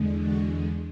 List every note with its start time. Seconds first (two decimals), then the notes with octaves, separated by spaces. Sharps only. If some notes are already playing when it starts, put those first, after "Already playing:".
Already playing: E2 D3 G#3
0.20 F#4